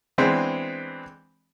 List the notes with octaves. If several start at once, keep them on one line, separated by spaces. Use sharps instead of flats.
E3 G#3 B3 C4 D4